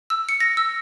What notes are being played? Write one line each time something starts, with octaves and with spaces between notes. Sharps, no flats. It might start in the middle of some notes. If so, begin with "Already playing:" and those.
E6
C#7
A#6
E6